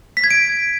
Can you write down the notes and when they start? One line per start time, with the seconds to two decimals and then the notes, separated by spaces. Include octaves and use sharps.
0.17 B6
0.24 G#6
0.31 D7